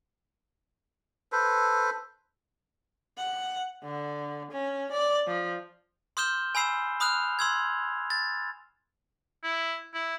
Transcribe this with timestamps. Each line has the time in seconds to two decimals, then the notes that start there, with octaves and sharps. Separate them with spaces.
1.32 A4 B4 C5
3.18 F#5
3.84 D3
4.52 C#4
4.92 D5
5.27 F3
6.17 C6 D#6 F6 G6 E7 G7
6.55 G#5 B5 E6 C7 E7
7.00 B5 D#6 F6 F#6 F7
7.39 C6 E6 G#6
8.10 A6
9.44 E4
9.94 E4